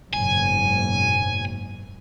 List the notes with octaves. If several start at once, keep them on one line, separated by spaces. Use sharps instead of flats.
F#1 G#2 B2 G#5